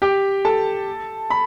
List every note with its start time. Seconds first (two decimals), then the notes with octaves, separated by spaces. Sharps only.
0.02 G4 G5
0.45 A4 A5
1.30 B5